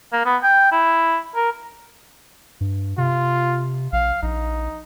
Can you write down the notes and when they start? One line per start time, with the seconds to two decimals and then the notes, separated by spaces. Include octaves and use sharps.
0.13 A#3
0.26 B3
0.43 G5
0.72 E4
1.35 A#4
2.61 G2
2.98 C3 F4
3.92 A#1 F5
4.22 A#1 D#4